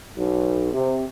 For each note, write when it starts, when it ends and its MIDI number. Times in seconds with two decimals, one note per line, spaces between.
0.15 0.73 35
0.74 1.03 48